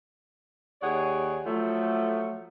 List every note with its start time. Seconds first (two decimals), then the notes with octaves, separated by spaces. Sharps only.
0.82 D#2 G#4 C#5 D5 F#5
1.46 F3 F#3 A3